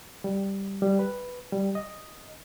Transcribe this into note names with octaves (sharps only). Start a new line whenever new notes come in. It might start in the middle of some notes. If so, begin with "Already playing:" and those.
G3
G3
B4
G3
D#5